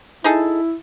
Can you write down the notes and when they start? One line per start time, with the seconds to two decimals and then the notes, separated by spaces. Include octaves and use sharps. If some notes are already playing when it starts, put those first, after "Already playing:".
0.24 D#4 E4 G#4 A4